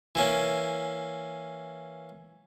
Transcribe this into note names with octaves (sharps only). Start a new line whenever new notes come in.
E3 A#3 C#4